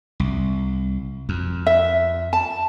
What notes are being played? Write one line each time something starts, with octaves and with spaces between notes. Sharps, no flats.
C2
F2
E5
A5